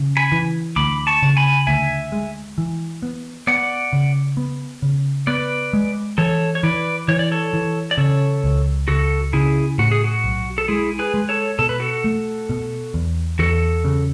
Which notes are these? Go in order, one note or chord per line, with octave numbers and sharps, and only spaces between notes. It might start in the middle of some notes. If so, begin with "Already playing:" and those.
Already playing: C#3
G#5 B5
E3
D2 B5 D6
A5 C#6
C#3
G#5 B5
D2 E5 G#5
G#3
E3
B3
B3 D5 F#5
C#3
B3
C#3
B3 B4 D5
G#3
E3 A4 C#5
C#5
E3 B4 D5
E3 C#5
D5
A4 C#5
E3
D5
C#3 A4 C#5
C#2
C#2 F#4 A4
C#3 E4 G#4
A2 F#4
G#4
F#4
B1
A4
G#3 E4 G#4
G#4 B4
G#3
A4 C#5
B2 A4
B4
F#4 A4
A3
B2
E2
E2 F#4 A4
C#3